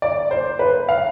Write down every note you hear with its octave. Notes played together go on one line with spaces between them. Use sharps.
D5
C5
B4
F5